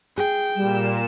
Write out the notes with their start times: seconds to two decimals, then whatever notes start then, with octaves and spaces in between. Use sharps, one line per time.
0.18 G#4 G5
0.56 A#2 G3 E7